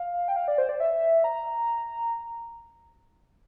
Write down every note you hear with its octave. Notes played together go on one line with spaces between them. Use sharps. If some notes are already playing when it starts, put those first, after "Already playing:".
Already playing: F5
G5
F5
D5
C5
D5
E5
A#5